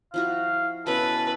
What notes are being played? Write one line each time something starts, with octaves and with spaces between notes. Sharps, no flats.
F3 E4 F#4 F5
B2 C#4 E4 A4 B4